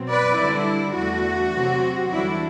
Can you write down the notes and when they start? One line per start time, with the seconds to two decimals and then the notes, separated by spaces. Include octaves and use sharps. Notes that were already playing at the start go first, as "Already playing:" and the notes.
Already playing: B2 F#3 C4
0.11 B4 D5
0.40 D3 G3 D4 E4
0.97 E2 D3 A3 F#4
1.54 C3 F#3 C4
2.11 E2 D3 G3 D4 E4